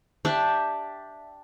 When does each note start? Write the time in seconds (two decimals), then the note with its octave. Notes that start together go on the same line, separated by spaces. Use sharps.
0.25 D4 G4 D5 E5